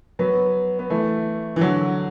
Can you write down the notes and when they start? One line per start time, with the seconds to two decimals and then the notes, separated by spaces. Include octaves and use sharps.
0.19 F#3 B3
0.79 B3
0.90 E3 A3
1.56 E3
1.61 D3 F#3